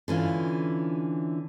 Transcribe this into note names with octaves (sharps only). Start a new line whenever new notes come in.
D3 E3 C#4 F4